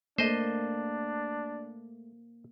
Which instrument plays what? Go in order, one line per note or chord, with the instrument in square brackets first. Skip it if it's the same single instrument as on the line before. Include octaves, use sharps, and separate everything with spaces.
[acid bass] A3 [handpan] A#3 [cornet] D4 [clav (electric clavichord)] C5 D#5